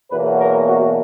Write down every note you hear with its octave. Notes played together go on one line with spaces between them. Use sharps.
E2 B2 F#3 A#3 B4
A#4
F#4